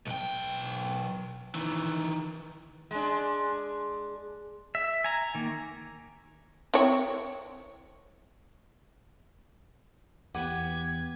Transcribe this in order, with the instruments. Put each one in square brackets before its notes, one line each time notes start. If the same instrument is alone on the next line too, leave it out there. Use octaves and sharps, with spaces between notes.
[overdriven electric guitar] B1 G5
D#3 E3
[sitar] G#3 D4
[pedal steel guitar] E5
G#5 A#5
D#3 A#3
[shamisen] C4 E4 C#5
[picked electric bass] E2 [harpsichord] B3 G4 B4 [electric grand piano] F#5 D6 D#7 [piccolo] G#6